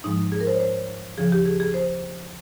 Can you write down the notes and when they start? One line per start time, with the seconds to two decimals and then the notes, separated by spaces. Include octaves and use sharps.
0.04 G#2 F3 G#3 D#4
0.32 G#4
0.40 A#4
0.47 C5
0.55 C#5
0.60 C5
1.18 D#2 C#3 F3 G#4
1.32 G4
1.45 G#4
1.60 G#4
1.74 C5